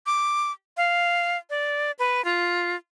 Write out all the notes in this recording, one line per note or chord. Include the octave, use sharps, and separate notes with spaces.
D6
F5
D5
B4
F4